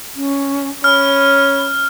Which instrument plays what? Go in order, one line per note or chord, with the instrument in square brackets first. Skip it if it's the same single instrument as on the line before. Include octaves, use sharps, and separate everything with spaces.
[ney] C#4
[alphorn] C#4 [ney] B5 [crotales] F6